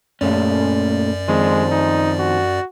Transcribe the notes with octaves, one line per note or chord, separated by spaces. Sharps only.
F#2 A#2 A3 C#4 D5
D#3 F3 G#3 C4
D#4
F#4